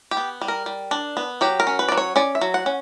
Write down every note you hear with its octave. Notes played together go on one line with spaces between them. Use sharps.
G4
B3
G3
A#4
G3
D4
B3
F#3 G4
A#4
C#4
B4
F#3 D5
C#5
C#4 D5
E5
F#3
F#5
C#4